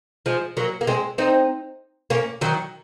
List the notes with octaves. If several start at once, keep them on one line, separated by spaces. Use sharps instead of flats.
F3 G#3
F#3 A#3
A#3
G#3 C4
C4 D#4
A#3 C#4
D#3 F#3